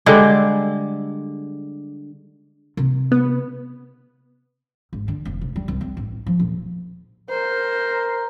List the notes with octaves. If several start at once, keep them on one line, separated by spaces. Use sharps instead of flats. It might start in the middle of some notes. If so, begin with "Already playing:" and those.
D3 G3 G#3 D4
C3
B3
G#1
D3
F1
C3
G3
C2
C4
A1
F3
D#1
A#4 C5